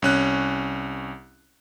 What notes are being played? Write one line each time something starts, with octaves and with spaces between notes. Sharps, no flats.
C2 C#4 F#6